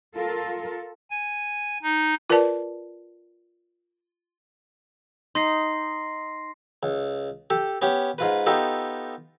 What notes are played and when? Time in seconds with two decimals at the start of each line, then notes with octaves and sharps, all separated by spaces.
0.15 F4 A4 A#4
1.11 G#5
1.83 D#4
2.30 F4 A#4 B4 D5 A5
5.35 D#4 C6 A#6 C7
6.83 C#2
7.50 G4 A4
7.82 B3 C#4 G4
8.18 G#2 F4 B4
8.46 B3 D#4 F4 G4 A4